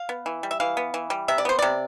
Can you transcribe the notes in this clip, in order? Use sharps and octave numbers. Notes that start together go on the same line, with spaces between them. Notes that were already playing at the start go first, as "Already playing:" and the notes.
Already playing: F5
B3
E3
G3
E5
E3 F5
B3
E3
G3
C3 E5
D5
B3 C5
C3 D5